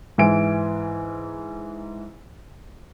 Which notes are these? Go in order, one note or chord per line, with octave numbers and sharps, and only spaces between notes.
G#2 E3 G#5 D7